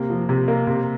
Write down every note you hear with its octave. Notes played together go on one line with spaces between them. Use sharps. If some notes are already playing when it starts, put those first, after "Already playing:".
Already playing: C3 A#3
F3
C3
A#3
C3